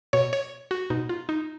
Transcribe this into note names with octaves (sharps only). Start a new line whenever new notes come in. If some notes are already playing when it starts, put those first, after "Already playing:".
B2 C#5
C#5
F#4
B2 D#4
F4
D#4